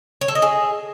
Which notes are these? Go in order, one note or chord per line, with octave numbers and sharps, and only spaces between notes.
C#5
A4
D#5
G#4